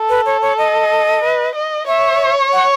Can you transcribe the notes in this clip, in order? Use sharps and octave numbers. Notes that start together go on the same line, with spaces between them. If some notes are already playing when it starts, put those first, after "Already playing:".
Already playing: A4
B4
C#5
C#5
D#5
B4
D#5
C#5 E5
F#5